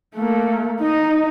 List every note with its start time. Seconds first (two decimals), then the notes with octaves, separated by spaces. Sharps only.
0.16 A3 A#3
0.81 D#4 D#5